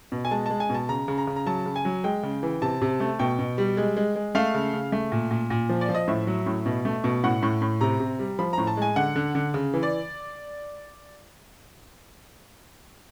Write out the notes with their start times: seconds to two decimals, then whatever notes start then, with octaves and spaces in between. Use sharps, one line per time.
0.12 B2
0.25 G#5
0.31 G#3 A5
0.46 G#3 A5
0.60 G#5
0.70 B2 A5
0.89 C#3 A#5
1.08 C#3
1.18 A#5
1.27 C#3
1.36 A#5
1.46 F#3 A5
1.66 C#3
1.76 G#5
1.85 F#3
2.04 G#3 G5
2.23 C#3
2.43 E3
2.62 C3 A5
2.81 C3
3.00 A3
3.19 B2 G5
3.39 B2
3.58 G3
3.77 G#3
3.96 G#3
4.16 G#3
4.35 A3 F5
4.54 C#3
4.73 C#3
4.92 A3
5.12 A#2
5.31 A#2
5.50 A#2
5.69 F3
5.81 D5
5.89 F3
5.95 D#5
6.08 A2 E5
6.27 F#3
6.46 A2
6.66 B2
6.85 A3
7.04 B2
7.23 A2 F#5
7.43 A2
7.62 A2
7.81 C3 A#5
8.00 C3
8.19 G3
8.39 F3 B5
8.53 A2 A#5
8.67 A5
8.77 G#3 G#5
8.96 D3 F#5
9.16 D3
9.35 D3
9.54 C#3
9.74 E3
9.83 D5